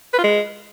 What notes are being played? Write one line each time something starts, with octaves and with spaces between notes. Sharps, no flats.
B4
F4
G#3